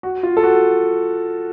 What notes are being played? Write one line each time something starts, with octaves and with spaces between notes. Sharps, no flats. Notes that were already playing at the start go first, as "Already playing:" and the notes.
F#4
F4
A4
F#4